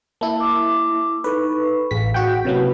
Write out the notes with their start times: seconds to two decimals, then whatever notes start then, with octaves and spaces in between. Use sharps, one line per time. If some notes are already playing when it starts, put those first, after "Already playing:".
0.21 A#3 E4 A5
0.40 D6 E6
1.24 D#4 A4 B4 C#6
1.91 A1 G#4 F5 B6
2.14 F#4 F#5 G5
2.45 C3 F#3 A#3 C#4 E4 B4